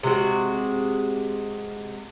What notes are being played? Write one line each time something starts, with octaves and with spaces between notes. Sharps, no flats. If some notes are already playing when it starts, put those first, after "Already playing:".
C3 G#3 F#4